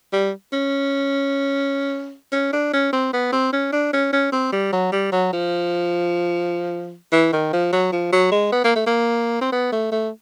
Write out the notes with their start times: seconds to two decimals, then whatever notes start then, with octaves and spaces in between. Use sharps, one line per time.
0.13 G3
0.53 C#4
2.32 C#4
2.53 D4
2.73 C#4
2.93 C4
3.13 B3
3.33 C4
3.53 C#4
3.73 D4
3.93 C#4
4.13 C#4
4.33 C4
4.53 G3
4.73 F#3
4.92 G3
5.12 F#3
5.33 F3
7.12 E3
7.33 D#3
7.53 F3
7.73 F#3
7.92 F3
8.13 F#3
8.32 G#3
8.52 B3
8.64 A#3
8.76 A3
8.87 A#3
9.42 C4
9.53 B3
9.72 A3
9.92 A3